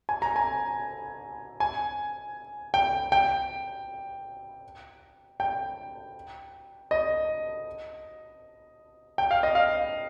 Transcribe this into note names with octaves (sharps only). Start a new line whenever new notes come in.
G#5
A#5
G#5
G#5
G5
G5
G5
D#5
G5
F5
D#5
F5